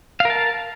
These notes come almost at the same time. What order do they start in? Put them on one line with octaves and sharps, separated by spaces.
F5 A#4 A5